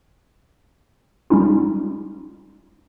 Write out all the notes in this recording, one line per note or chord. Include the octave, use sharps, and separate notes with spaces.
G3 G#3 C#4 D#4 F4